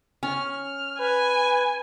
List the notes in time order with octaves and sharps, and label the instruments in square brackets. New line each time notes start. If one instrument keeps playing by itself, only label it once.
[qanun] C#4 [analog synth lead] F6
[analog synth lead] B4 [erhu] G#5